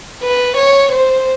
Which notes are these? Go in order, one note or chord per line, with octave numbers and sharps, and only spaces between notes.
B4
C#5
C5